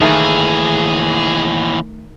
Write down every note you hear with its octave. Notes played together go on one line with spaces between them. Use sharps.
D#2 D#3 E3 A3 G#4